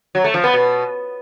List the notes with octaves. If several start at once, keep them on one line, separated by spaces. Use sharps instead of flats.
F#3
A3
F3
B3
B2